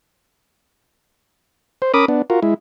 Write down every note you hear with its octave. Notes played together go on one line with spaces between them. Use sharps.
C5
C#4 A#4 B5 D6 D#6
B3 D4
F4 F#4 A#4
G#3 E4